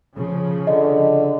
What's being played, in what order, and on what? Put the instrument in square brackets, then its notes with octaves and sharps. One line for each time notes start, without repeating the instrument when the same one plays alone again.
[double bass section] C#3 F3
[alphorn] D3 [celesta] D#5